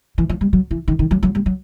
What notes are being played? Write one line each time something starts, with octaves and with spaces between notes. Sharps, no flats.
E3
F3
G3
F#3
E3
D#3
D#3
F#3
F#3
G3
F#3